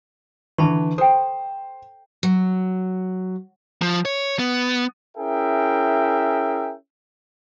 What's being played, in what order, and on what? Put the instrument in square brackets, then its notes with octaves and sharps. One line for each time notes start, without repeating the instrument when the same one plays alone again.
[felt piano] D3 E3 [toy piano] A5 B5 C#6
[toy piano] A4 G5 [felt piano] C5
[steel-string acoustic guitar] F#3
[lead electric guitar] F3
C#5
B3
[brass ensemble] C#4 E4 G#4 A#4 E5 G5